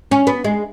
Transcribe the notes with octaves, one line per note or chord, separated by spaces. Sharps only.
C#4
B3
G#3